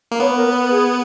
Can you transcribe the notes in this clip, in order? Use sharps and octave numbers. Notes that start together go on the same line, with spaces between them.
A#3
B3 C#5
B4
A#4
B4
G#4